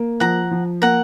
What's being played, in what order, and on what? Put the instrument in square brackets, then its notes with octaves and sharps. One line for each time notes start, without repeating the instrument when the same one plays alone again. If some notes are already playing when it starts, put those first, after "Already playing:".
Already playing: [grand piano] A#3
[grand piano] F3 [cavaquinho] F#5 A#5
[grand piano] F3
[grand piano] A#3 [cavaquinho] F#5 A#5